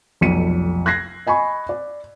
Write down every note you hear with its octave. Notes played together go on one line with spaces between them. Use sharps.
F1 B1 F2 C#7 D#7
F#6 G#6 A#6 C7
D#5 G#5 B5 C#6
D5